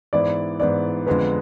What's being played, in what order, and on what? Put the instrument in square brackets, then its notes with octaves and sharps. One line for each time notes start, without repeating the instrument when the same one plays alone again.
[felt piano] G#2 E3 B3 E4 [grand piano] D5
[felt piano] G#2 E3 B3 E4 [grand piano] D5
[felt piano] F2 D3 G#3 B3 [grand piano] B4